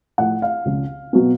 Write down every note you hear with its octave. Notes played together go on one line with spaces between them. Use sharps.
A2 F3 A3 F#5
F5
C#2 C#3 F3
B2 F#3 B3